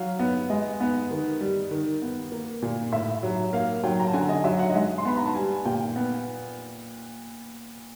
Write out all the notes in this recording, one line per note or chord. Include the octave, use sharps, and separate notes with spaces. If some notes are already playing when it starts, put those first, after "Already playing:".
Already playing: F#3 F5
B3
G#3 D#5
B3
D#3
G3
D#3
B3
A#3
A#2
A2 E5
F#3
A#3 F5
F#3 G5
A#5
A5
D3 G#5
D#5
F#3 E5
F#5
D#5
G#3 E5
C6
B3 B5
A#5
A5
G3 G#5
A#2 G5
B3